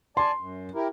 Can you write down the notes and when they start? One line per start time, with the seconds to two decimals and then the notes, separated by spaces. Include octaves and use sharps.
0.17 D5 G#5 A5 C6
0.38 F#2
0.75 E4 G4 A#4